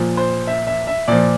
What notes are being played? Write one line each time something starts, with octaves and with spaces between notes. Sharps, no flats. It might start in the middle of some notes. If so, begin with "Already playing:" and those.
Already playing: A#2 F3
C5
E5
E5
E5
A#2 F3 D5